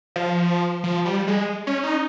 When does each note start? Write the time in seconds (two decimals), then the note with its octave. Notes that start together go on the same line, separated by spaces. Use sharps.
0.16 F3
0.84 F3
1.05 G3
1.27 G#3
1.67 C#4
1.83 D#4